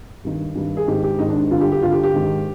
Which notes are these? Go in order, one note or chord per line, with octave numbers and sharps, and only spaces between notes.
G2 D#3
G2 D#3
G#4
G#2 D#3 G4
G4
G#2 D#3 D#4
D4
G2 D3 F4
G4
G4
G2 D3 F4
G4
G4
G#2 D#3